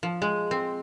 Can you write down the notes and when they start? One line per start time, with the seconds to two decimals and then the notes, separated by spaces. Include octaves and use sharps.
0.03 F3
0.22 G#3
0.51 C4